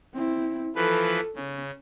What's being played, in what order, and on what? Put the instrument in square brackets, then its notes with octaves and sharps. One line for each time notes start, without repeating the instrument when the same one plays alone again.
[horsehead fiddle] C4 E4
[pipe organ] E3 F3 B4 [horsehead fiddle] A4
[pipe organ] C#3 [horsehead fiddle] C#4